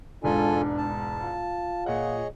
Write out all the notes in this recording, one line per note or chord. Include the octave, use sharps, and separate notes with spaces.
E1 G#2 D4 F4 A4 G#5
A5
F4
A#2 G#4 C#5 D#5 F#5